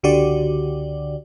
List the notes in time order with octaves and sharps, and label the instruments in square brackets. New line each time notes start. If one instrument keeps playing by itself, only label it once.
[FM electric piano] C#2 D3 F#4 G4 D5